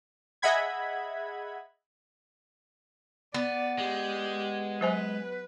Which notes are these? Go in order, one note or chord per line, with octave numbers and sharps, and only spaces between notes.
G#4 D#5 E5 F#5 B5 G#6
B3 D5
G#3 G4
F#3 B4 C5 G#5